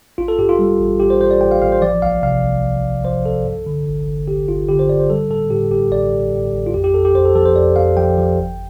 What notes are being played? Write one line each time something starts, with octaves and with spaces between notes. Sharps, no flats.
A1 F4
A4
G2 G4
F4
G3
A1
A1 G4
C5
A1 C5
D5
A1 G5
F5
A1 F5
C5
F3 D5
C2 F5
C3 F5
C2
C2
C2
F3 C5
C2 A4
G2
D3
G1
G1
G1 G4
G1 F4
D3 G4
C5
G2 D5
C5
G3 A4
A2 A4
A2 G4
A1 G4
A1 D5
A1
A2
A1
F4
F2 G4
G4
F2 A4
G4
F2 C5
A4
F3 A4
C5
F2 D5
F2 F5
F3 G5
F3
G1